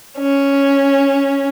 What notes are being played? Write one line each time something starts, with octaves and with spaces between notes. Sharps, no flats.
C#4